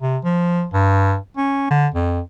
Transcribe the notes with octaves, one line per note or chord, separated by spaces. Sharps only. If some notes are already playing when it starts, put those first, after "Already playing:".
C3
F3
G2
C#4
D3
F2